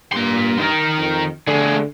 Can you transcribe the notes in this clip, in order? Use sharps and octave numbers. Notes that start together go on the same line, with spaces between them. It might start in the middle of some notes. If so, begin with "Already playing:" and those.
G2 A#3 C6
D#3 A#4
F2
D3 A3 G#4